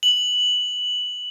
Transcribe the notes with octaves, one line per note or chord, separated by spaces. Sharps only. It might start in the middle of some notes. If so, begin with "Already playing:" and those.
F#7